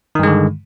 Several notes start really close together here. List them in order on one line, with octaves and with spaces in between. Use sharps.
D#3 G2 G#3 D3